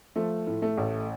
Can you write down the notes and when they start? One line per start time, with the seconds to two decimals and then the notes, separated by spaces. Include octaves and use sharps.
0.16 F3 A3
0.47 A2
0.62 A3
0.78 A1